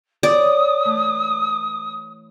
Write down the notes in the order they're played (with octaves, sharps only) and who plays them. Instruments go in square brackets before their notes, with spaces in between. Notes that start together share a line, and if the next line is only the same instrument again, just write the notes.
[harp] C#5 [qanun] D5 [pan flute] D#6
[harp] E3 A3